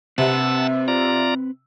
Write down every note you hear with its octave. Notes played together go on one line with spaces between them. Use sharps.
C3 C4 B4 F#5 A5 E6
F4 D5 A#5